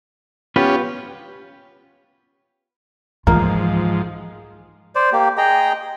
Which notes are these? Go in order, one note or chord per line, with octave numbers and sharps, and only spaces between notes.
B3 C#4 F4 G4 B4
G#2 E3 F3 A#3 F4
C5 D5
A#3 G4
G#4 D#5 G5 A#5